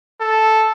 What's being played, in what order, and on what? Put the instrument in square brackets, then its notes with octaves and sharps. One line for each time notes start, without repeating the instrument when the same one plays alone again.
[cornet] A4